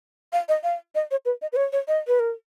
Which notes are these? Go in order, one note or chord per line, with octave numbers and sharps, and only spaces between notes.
F5
D#5
F5
D#5
C#5
B4
D#5
B4
C#5
C#5
D#5
B4
A#4